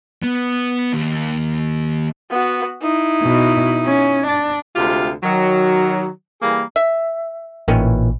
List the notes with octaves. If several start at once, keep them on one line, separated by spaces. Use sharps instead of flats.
B3
D#2
B3 F#4
D#4 E4
B2
C#4
D4
D2 C3 G#3 F4 G4
D#3 F#3
E3 G3 A#3 G#4 A#4
E5
A1 A#2 D#3 E3 C#4